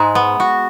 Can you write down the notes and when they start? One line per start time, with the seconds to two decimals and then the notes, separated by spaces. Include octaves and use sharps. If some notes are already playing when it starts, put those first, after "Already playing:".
Already playing: G#2 G#3
0.15 B3
0.40 F#4